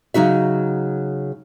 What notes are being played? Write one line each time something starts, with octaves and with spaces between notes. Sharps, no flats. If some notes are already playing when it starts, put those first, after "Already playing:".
C#3 F#3 D#4 F#4 E5